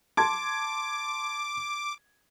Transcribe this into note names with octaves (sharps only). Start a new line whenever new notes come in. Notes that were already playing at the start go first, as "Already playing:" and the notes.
A5 C6 D6 G#6